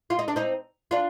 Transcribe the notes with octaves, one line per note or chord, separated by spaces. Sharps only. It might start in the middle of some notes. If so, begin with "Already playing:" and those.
F4
D#4
D4
C4 D#4
D4 F4